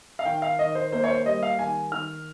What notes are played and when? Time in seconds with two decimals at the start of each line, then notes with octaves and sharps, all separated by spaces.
0.19 F5
0.25 D#3 G5
0.42 F5
0.59 D#3 D#5
0.75 C5
0.92 A#3 C5
1.04 C#5
1.10 C5
1.26 G3 D#5
1.43 F5
1.59 D#3 G#5
1.92 D#3 F6